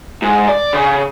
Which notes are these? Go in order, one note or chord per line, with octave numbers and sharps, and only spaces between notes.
G#2
D5
C#3